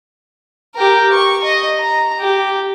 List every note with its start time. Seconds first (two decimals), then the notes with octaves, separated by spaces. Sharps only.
0.75 G4 A#4
1.12 C#6
1.44 D#5
1.79 A#5
2.20 G4